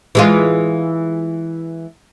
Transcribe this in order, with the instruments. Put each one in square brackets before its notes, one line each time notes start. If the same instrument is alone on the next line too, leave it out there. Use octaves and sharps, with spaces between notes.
[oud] E3 G#3 F4